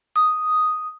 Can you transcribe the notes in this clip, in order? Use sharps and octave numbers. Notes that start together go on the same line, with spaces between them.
D#6